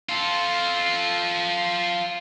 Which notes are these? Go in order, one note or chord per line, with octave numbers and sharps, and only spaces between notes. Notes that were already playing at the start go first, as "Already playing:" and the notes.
F4 A4